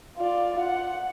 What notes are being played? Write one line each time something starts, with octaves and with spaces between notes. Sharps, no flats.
F4 D5
F#5